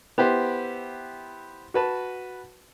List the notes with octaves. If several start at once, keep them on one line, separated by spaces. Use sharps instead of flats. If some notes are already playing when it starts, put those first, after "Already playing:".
B3 E4 G4 B4 C5
F#4 B4 A5